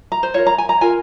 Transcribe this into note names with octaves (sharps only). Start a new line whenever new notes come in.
A#5
C5
F4 A#4 C#5
A#5
G#5
A#5
F4 A#4 G#5